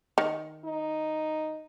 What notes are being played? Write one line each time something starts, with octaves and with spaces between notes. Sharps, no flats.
D#3
D#4